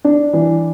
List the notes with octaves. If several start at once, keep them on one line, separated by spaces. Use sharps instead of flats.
D4
E3